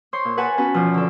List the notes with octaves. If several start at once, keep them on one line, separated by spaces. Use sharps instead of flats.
C5 C#5 C6
A#2
B4 F#5 G#5 A5
B3 C#4 F#4 B4
E2 B2 F3 F4
D3 A4